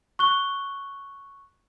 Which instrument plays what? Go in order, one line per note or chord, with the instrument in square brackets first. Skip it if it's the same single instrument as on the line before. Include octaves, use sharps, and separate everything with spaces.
[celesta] C#6 F#6 G7